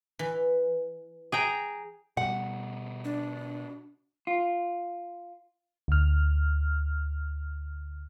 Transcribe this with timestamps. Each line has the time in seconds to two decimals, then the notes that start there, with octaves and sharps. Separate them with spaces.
0.19 E3
1.32 G#4 G5 A#5
2.17 B2 G3 F#5
3.04 D4
4.27 F4
5.88 D2 F6